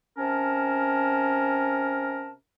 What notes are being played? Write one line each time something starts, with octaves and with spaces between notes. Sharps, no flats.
C3 C#4 A#4 A5